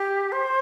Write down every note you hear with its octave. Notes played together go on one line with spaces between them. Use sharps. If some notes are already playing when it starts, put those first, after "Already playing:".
Already playing: G4
C5